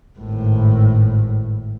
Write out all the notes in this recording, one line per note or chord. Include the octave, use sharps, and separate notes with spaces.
G#1 A2